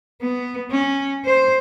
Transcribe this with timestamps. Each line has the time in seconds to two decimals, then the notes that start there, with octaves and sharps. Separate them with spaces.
0.22 B3
0.71 C#4
1.25 C5